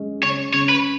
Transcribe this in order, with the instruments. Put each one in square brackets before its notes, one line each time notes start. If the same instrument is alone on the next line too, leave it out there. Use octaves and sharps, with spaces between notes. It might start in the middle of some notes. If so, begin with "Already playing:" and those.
Already playing: [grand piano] G#3 C#4
[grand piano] C#3 [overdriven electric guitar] C#5
[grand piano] C#3 [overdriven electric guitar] C#5
[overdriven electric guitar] B4